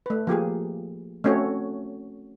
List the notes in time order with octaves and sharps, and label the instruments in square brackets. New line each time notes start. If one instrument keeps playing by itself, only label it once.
[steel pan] A3 B4
F3 A#3 G4 G#4
A3 C4 C#4 F#4 C#5